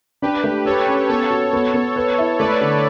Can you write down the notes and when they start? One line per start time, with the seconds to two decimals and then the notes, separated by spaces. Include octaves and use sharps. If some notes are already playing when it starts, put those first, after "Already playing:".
0.22 D4 G4 B4
0.44 A3
0.65 G4 A4 C#5
0.87 C#4
1.09 B3 A4 C#5
1.31 F#4
1.53 B3
1.74 B3
1.96 B4
2.18 E4
2.39 A3 B4 D5
2.61 D3